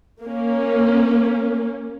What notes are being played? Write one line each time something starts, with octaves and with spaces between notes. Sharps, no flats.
A#3 C#4